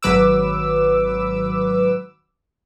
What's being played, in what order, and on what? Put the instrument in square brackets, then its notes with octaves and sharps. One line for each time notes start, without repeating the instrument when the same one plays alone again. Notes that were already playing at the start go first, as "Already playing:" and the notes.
[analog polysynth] G#1 F#3 B4 D6 E6